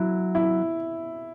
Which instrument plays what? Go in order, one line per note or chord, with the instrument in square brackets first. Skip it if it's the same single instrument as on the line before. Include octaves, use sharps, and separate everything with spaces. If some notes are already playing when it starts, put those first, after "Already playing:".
Already playing: [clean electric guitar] F#3 [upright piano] E4
[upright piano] E4